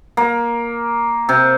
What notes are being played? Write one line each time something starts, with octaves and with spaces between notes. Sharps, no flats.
A#3
C3